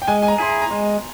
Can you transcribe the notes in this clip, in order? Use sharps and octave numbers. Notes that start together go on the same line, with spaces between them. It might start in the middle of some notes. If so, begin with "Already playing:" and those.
G5
G#3 G#5
G#5
A#5
E4 G#4 C6
A#5
A#5
G#3 C6